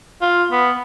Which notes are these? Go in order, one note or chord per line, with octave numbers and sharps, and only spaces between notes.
F4
B3